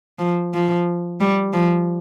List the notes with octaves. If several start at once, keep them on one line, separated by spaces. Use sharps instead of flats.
F3
F3
G3
F3